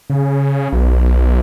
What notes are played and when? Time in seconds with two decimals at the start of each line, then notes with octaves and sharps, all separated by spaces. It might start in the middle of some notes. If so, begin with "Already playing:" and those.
0.10 C#3
0.72 B1